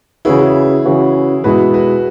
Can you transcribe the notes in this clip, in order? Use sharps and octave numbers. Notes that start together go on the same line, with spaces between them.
C#3 E3 C#4 E4 F#4 G#4 B4
C#3 E3 C#4 F#4 B4
B2 G#3 E4 F#4 G#4 B4
F#4 B4